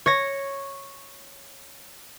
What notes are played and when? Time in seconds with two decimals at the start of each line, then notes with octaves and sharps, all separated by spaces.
0.06 C#5 A#6